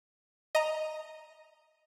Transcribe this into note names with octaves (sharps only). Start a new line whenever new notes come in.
D#5 A#5